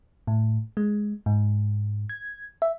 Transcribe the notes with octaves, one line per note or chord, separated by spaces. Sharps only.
A2
G#3
G#2
G#6
E5